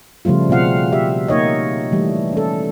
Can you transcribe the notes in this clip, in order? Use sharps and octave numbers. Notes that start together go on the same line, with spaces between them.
C#3 F3 G3 A3 F4
B2 C4 F4 F5 F#5
G4 E5
A#3 D#4 C#5 D#5
E3 G3 A3
C#4 A4